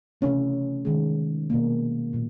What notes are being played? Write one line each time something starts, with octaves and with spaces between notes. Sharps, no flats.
C3 E3 A3 C#4
D#3 G#3
B2 G3 A#3
A#2 F#3